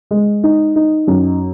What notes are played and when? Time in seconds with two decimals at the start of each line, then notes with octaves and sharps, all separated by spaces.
0.11 G#3
0.44 D#4
0.76 D#4
1.07 F#2